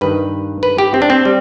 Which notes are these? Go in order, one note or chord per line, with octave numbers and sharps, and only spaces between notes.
G2 D#3 G3 B4
B4
G4
C4
D4
C4
G3